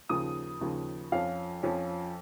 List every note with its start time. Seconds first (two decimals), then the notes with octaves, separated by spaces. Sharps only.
0.09 D#2 C#3 F3 D#6
0.61 D#2 C#3 F3
1.12 F2 F3 C#4 F5
1.63 F2 F3 C#4